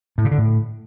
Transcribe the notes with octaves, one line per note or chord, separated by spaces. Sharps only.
A2
C#3
D3
A2